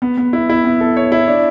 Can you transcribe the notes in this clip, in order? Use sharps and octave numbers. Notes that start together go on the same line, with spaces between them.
B3
B3
E4
E4
B3
A4
C#5
E4
D4